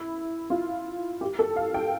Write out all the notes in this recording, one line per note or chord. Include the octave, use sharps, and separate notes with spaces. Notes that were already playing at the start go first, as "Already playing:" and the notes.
Already playing: E4
F4
G4
A4
F5
G5